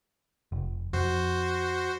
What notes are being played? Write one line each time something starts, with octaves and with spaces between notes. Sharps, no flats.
F1
F2 F#4 C5